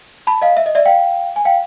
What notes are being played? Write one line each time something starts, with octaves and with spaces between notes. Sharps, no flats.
A5 B5
D#5 F5
E5
D#5
D5 E5
F5 G5
G#5
F5 G5